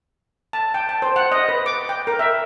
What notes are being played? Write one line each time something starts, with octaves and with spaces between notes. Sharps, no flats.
A5
G5
A5
C5
F#5
D#5
B4
D6
G5
A#4
E5